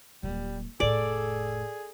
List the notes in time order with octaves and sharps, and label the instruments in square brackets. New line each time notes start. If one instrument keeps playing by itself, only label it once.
[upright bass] D#1 F#3 [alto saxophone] G3
[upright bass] F1 A2 [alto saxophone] G#4 [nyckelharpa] A4 [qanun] D5